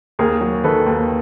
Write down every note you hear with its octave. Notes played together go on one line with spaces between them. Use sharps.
D#2 G#4 A#4
F#3
D#3 A4 B4
D#2